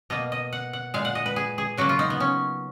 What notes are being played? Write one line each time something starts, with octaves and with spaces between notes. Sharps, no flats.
B2 A#3 D#5
D#5
F#5
F#5
A#2 G#3 F5
F#5
D#5
B4
G#4
G#4
C#3 F#3 A#3 F#4
F4
D#4
B3
C#4